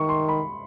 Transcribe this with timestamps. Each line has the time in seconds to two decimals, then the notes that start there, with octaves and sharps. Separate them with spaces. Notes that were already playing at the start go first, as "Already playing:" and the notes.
Already playing: D#3 C#6
0.09 C6
0.29 B5